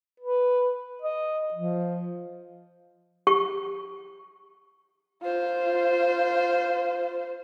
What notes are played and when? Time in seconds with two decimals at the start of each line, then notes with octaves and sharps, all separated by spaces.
0.20 B4
1.02 D#5
1.54 F3
3.27 G4 C#6
5.22 F4 C5